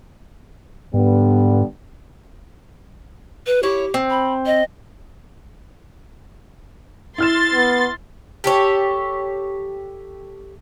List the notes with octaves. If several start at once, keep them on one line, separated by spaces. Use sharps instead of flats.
G#2 D3 G3 B3
B4
E4 G4 C#5
C4
B5
D#5
E4 C6 F6 A6 E7
B3
G4 A4 C#5